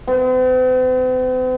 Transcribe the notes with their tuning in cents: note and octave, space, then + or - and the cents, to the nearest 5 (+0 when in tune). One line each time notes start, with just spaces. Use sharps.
C4 -45